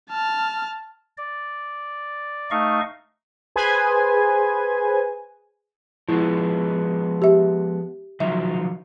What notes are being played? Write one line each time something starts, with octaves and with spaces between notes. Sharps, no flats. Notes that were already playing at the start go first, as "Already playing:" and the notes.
A5 F6
D5
A3 D#4 D#5 F5 C#6
G#4 B4 C5 G#5
F3 G#3 B3 E4
G4 E5
D#3 F3 F#3 E5